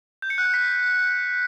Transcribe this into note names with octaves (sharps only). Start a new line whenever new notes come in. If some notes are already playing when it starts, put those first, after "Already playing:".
G6
C#7
F#6
G6
B6